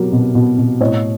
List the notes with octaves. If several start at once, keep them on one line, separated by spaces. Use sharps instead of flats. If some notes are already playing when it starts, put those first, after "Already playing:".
Already playing: B2 F#3 G4 A#4
B2
B2
B2
A2 C#5 D#5